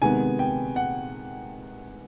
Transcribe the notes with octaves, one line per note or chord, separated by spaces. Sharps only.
C3 D#3 G#3 B3 G#5
G5
F#5